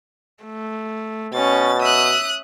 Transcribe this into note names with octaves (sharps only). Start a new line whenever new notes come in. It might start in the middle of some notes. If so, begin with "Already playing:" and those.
A3
B2 C#4 A6
E5 D#6 F#6